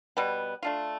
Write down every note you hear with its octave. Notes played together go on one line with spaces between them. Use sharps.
B2 G3 B3
A3 D4 F4